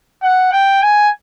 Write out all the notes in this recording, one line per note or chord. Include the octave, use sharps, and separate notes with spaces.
F#5
G5
G#5